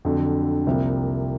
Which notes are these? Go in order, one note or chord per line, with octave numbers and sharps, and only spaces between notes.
F2 D3 F#3
C2 C3 F3 A#3